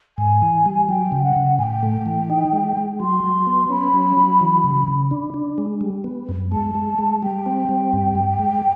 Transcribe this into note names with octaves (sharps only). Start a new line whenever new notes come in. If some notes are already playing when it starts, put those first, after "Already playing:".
G#2 G#5
E3
G3
F#3 G5
C#3
F#5
C#3
A2 G5 G#5
A3
E3
D#4
G#3
G#3
F#3 C6
F#3
B3
C#4 B5
F#3
F#3
E3
C#3
C#3
D4
D4
G#3
G3
B3
F#2
G#3 A5
G#3
G#3
G3 G5
C4
G3
G2
G2
G#3